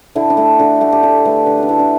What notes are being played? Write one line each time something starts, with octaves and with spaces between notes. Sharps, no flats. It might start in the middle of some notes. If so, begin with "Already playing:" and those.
D3 E4
D4
A3 E4
D3 F#4
A3 G4
G4
D3 A4
A3 B4
D3 B4
D4 F#4
A3 E4
D4